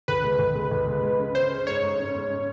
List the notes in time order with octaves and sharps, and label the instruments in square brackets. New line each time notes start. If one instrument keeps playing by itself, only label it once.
[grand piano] C#2 [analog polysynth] B4
[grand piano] G#3
C#2
G#3
C#2
G#3
G#3
C#3
[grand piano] C#4 [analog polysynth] C5
[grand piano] C#4
[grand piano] G#2 [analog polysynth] C#5
[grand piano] G#2
C#4
G#2
C#4